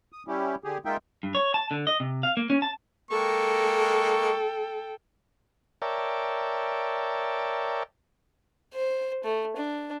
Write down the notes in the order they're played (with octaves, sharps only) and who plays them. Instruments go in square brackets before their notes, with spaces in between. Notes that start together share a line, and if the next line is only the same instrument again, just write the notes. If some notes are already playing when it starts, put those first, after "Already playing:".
[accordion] D#6
G3 C#4 E4 G4
D3 G4 G#4
G#3 A#3 D#4 F4 E5 G5
[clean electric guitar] G2
C#5
A5
D3
D#5
C3
F5
A#3
C#4
A5
[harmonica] G#3 A#3 C#6 [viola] A4 G5
[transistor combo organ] A#4 C#5 D5 E5 G5 A5
[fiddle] C5
A3
D4